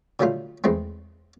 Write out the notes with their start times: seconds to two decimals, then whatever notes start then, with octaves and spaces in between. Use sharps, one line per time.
0.20 D3 F#3 G3 A3 F4
0.64 E2 G#3 A3 C4